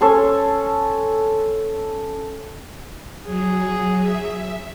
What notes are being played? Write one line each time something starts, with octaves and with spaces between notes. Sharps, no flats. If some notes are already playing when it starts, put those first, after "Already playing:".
C#4 A4 G#5 C6
F#3 G#4
E5